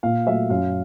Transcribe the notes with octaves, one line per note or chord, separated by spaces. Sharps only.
A#2 F5
F#3 A3 E5
F#2 F5